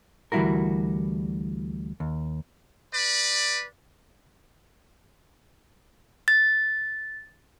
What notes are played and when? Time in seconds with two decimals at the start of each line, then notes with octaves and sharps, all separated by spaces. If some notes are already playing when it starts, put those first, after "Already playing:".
0.32 D2 E3 G3 E4 F#4 A#4
2.00 D#2
2.94 B4 D5
6.28 A6